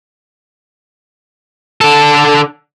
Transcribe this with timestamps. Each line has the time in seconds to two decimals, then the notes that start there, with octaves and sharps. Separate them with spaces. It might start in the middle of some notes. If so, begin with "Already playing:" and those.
1.81 D3 A4